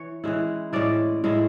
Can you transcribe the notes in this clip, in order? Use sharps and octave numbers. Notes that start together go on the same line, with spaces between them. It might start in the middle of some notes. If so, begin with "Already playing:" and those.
Already playing: E3 C#5
E3 G#3 C#4 E4
A2 G#3 C#4 E4 D5
A2 G#3 C#4 E4